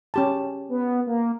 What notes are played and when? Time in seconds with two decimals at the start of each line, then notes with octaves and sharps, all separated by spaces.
0.14 C#4 G4 A5
0.69 B3
1.07 A#3